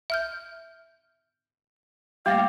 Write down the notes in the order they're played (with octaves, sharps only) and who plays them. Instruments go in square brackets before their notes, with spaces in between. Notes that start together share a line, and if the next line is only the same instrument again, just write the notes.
[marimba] E5 F6 G6
[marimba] G3 A3 A#3 [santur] G4 [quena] F5